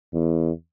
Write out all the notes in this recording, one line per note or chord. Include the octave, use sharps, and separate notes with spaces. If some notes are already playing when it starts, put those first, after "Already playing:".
E2